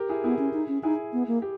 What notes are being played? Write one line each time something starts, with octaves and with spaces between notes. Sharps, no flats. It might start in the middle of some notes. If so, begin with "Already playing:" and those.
Already playing: G4 A#4
E4 G#4
B3 E4 G#4
C#4
D#4
C#4
D#4 E4 G#4
B3
A#3
G4